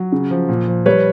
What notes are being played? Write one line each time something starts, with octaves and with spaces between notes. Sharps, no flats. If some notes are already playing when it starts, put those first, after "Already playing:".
Already playing: F#3
C#3
F3
A#2
F3
G3 B4 C#5